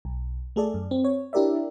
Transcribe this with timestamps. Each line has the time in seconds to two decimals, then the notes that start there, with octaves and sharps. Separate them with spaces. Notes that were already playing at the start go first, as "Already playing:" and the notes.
0.05 B1
0.56 A3 G#4 A4 D5
0.74 F#2
0.91 C4
1.04 C#5
1.33 D4 E4 G4 A#4 D5 E5